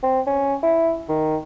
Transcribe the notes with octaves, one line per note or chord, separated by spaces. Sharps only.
C4
C#4
E4
D#3